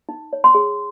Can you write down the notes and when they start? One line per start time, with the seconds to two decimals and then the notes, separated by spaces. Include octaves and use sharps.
0.09 D#4
0.33 C#5
0.44 C6
0.55 G#4